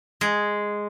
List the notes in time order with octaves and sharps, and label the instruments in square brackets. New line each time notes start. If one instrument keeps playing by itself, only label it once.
[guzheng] G#3